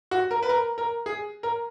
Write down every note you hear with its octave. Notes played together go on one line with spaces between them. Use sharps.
F#4
A#4
B4
A#4
A#4
G#4
A#4